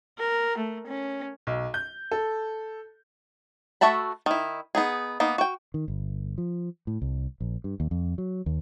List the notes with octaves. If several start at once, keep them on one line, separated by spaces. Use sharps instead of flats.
A#4
A3
C#4
B1
G6
A4
A3 F#4 E5 A5 B5
D#3 E4
B3 D#4 G#4
A#3 B3 D#4
F#4 G5
D#3
G1
F3
A2
C2
A#1
G2
D#2
F2
F#3
D#2